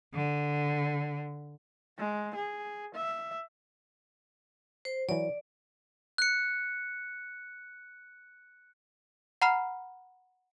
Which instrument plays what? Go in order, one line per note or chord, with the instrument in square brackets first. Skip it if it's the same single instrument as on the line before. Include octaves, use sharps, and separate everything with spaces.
[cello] D3
[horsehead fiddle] G#3
G#4
E5
[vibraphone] C5
[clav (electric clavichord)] E3 F#3 [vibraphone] D5
[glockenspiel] F#6 C#7
[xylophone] F#5 A#5 B5 F6 C7